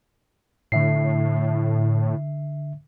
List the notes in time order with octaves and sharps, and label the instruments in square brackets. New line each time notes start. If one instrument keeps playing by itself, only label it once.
[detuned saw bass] A2 [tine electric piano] D3 E5 C7